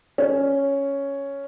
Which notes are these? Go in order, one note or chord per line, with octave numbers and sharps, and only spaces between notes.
C#4